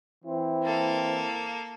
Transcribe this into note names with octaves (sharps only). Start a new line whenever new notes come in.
E3 C4 E4
A#3 A4